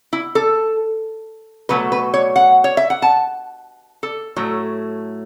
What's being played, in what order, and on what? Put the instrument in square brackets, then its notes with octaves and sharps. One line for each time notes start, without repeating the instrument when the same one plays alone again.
[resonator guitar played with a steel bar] E4
A4
B2 F#3 A3 B4
B4
C#5
F#5
C#5
E5
F#5
A5
A4
A2 F#3 A3